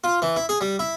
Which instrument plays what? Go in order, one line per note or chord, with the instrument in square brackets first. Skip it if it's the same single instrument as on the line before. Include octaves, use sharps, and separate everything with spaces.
[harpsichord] F4
E3
E4
G#4
G3
E4